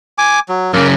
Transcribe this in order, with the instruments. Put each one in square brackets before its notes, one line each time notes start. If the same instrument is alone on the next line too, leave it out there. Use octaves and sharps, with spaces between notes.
[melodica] G#5 D6
F#3
[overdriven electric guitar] F#2 C#3 [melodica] A#3 A#4